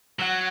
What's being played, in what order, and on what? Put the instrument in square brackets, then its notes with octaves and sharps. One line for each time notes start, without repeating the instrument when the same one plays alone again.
[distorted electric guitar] F#3 [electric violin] F#5